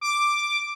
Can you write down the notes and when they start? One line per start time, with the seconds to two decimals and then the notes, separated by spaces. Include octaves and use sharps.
0.01 D6